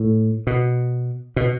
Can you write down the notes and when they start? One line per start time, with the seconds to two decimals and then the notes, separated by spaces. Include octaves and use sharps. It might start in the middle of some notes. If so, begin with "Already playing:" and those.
Already playing: A2
0.47 B2
1.36 B2